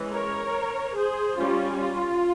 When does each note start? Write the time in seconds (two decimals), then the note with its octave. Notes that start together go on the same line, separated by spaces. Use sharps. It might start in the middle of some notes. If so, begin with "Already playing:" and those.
Already playing: E3 G#3 C#4
0.12 A#4 C#5
0.96 G#4 C5
1.37 G3 C#4 F4
1.79 F4